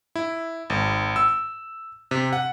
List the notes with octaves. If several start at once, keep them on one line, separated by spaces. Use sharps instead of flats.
E4
G#1
E6
C3
F#5